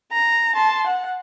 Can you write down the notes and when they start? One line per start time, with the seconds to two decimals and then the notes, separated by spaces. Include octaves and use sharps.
0.12 A#5
0.55 A5 C6
0.87 F#5